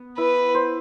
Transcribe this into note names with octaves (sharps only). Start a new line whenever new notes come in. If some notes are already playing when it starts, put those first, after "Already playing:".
Already playing: B3
E4 B4
C5